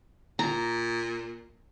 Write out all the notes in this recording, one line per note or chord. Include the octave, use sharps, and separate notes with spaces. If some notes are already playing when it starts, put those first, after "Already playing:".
A#2 A#5